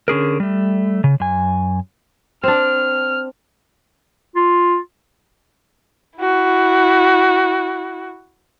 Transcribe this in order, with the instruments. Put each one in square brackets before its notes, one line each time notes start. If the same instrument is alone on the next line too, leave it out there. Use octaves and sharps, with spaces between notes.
[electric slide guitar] D3 C#4 G#4 A#4
G3 A3
C#3
F#2 G#5
[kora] C4 D4 [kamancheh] F6
[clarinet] F4
[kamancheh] E4 F#4